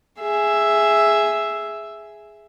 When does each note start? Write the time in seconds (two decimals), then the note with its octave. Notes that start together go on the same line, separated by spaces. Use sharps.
0.20 G#4 E5